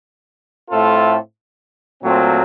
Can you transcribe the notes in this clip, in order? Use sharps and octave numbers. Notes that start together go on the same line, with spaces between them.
A2 A3 C4 F4 A4
A#2 F#3 A3 C4